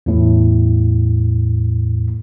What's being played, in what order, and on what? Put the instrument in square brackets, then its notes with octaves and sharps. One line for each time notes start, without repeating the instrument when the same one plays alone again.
[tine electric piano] E2 A2